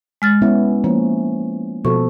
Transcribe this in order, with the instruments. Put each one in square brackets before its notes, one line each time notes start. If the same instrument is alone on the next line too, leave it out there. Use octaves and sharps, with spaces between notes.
[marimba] G#3 F6 A6
[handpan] B3 C#4 E4
[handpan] F3 C#4 [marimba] A#3
[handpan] B2 F3 A4 [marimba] C#6